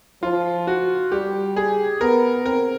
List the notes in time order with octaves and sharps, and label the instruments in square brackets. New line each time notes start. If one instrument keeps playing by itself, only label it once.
[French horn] F3 [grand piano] F4
[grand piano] F#4
[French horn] G3 [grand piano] G4
[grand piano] G#4
[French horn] B3 [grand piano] A#4
[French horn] C4 [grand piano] A#4